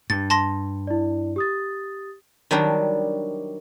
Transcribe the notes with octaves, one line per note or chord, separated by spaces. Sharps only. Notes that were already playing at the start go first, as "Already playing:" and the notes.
G2 A6
A5 C6 A#6
E4 D5
G4 D#6 A6
D#3 F#3 G3 D4